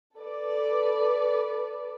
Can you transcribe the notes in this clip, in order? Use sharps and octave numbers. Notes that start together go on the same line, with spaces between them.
A4 B4 D5